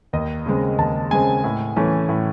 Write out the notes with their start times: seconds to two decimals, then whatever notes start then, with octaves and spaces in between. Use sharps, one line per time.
0.13 D#2 D#5
0.46 C#3 G#3 C4
0.78 D#2 A5
1.11 C#3 G#3 C4 G#5
1.44 A2
1.76 E3 A3 C#4
2.09 A2